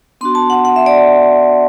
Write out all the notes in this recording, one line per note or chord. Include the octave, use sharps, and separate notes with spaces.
B3 D4 F#4 C6
A5
F#5
F#5
E5
D5